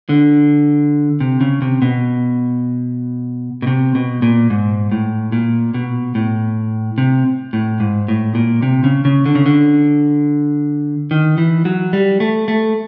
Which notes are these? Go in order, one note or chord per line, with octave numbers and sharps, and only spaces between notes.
D3
C3
C#3
C3
B2
B2
C3
B2
A#2
G#2
A2
A#2
B2
A2
C3
A2
G#2
A2
A#2
C3
C#3
C#3
D3
C#3
D3
D#3
E3
F#3
G3
A3
A3